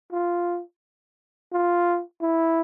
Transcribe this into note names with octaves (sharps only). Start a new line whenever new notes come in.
F4
F4
E4